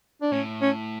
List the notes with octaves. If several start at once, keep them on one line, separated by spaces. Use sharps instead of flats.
D4
A2 C#4
C#4